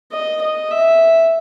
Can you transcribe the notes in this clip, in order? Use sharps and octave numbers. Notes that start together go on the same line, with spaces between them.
D#5
D#5
E5